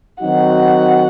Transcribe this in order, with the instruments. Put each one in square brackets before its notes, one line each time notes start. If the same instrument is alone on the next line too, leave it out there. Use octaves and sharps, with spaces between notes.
[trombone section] D#3 F#3 C4 D#4 F#4 [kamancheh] F#5